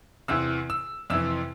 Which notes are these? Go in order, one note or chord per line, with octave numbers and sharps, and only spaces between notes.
E2 C3 E3 E6
E6
F2 C3 E3 E6